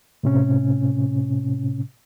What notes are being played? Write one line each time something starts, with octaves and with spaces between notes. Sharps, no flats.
A2 C3 C#4